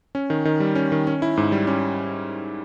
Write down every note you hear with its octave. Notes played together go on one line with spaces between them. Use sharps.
C#4
D#3
D#3
G3
C#4
D#3
C#4
E4
G#2
G3
C#4